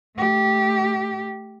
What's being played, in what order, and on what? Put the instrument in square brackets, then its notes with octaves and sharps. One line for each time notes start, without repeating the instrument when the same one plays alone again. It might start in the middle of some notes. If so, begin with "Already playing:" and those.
[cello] A3 G4